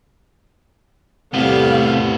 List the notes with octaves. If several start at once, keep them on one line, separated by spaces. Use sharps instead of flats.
A2 C3 G3 A3 B3 F5